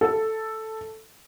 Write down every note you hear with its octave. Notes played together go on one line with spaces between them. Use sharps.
A4